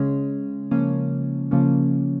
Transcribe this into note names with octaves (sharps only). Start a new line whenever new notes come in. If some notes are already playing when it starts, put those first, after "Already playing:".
Already playing: C#3 G#3 C#4
C#3 F3 A#3 C#4
C#3 F3 A#3 C#4